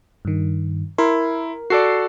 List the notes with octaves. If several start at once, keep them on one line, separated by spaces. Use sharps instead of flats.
G2 D#3
E4 A#4 C6
F#4 A4 D5 C7